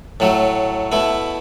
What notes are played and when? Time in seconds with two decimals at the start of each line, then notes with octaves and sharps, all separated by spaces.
0.20 A2 F#3 A3
0.92 B2 A3 E4